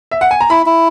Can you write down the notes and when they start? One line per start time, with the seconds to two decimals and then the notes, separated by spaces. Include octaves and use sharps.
0.11 E5
0.21 F#5
0.31 G#5
0.41 A#5
0.50 E4 B5
0.66 E4